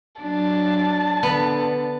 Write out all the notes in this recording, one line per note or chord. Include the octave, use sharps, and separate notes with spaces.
F#3 D4 A5
D3 B3